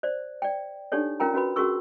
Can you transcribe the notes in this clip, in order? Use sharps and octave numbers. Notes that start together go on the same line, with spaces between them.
C5 D5
D5 G5
D4 D#4 G4 A4 C#5 D5
C#4 F4 A#4 G5 A#5
C#4 F#4 B4 B5
C#4 F#4 G#4 A#4 C#6 E6